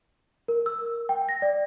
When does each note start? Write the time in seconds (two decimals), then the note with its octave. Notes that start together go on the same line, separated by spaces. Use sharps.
0.48 A#4
0.66 E6
1.09 G5
1.29 A#6
1.42 D5